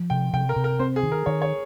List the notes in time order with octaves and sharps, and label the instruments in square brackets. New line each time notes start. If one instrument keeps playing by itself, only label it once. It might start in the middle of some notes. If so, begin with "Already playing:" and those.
Already playing: [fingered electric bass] F3
[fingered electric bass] C3 [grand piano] G5
[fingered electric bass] C3 [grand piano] G5
[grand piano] A#4
[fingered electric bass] C3
[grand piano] A#4
[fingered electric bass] C4 [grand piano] C5
[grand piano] G#4
[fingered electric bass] D#3
[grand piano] A#4
[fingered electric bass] D#3 [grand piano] C#5
[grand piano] C#5